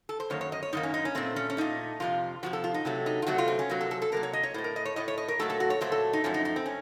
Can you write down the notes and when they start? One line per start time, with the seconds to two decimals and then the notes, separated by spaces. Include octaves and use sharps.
0.09 A4
0.20 C5
0.30 F#2 D#3 A#3 C#5
0.41 C#5
0.52 D#5
0.63 C#5
0.73 F#2 D#3 A#3 D#4
0.83 C#4
0.94 D#4
1.05 C#4
1.15 A#2 A3 C4
1.36 C#4
1.50 C#4
1.57 A#2 A3 D#4
2.00 F2 C3 F3 F4
2.43 F2 C3 F3 F#4
2.53 A4
2.64 F4
2.74 D#4
2.85 C3 F#3 A3
3.06 D#4
3.22 F4
3.26 C3 F#3 A3 F#4
3.38 F4
3.48 C4
3.59 C#4
3.69 C3 F#3 A#3
3.81 A4
3.91 A4
4.02 A4
4.12 C3 F#3 A#3 A#4
4.23 C#5
4.33 D#5
4.43 C#5
4.54 A2 A3 C5
4.64 A#4
4.76 D#5
4.85 C#5
4.96 A2 A3 D#5
5.08 C#5
5.18 D#5
5.28 A#4
5.39 A#2 F#3 A3 A4
5.50 A4
5.60 F#4
5.70 C#5
5.81 A#2 F#3 A3 C5
5.92 A4
6.13 D#4
6.24 F#2 F3 A3 C#4
6.34 D#4
6.45 D#4
6.56 C4
6.66 C#4